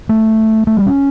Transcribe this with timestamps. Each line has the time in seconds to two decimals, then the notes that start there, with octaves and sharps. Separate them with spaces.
0.09 A3
0.67 A3
0.77 G3
0.86 C#4